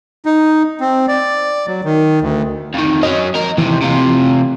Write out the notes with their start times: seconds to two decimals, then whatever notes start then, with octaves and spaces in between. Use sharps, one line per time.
0.26 D#4
0.80 C4
1.08 D5
1.67 F#3
1.84 D#3
2.22 D2
2.74 F2 D#3
3.03 F#3 C#4 D#5
3.35 F2 A#4
3.58 D#2 C3 E3
3.82 C3 F4